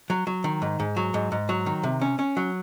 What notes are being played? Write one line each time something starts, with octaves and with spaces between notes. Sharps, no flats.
F#3
F#3
D#3
G#2
G#2
F#3
G#2
G#2
F#3
D#3
C3
C#4
C#4
F#3